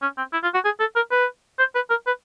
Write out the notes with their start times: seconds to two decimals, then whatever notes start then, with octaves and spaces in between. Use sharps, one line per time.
0.02 C#4
0.18 C4
0.33 E4
0.43 F4
0.54 F#4
0.65 G#4
0.80 A4
0.96 A#4
1.11 B4
1.59 C5
1.75 B4
1.90 A#4
2.07 B4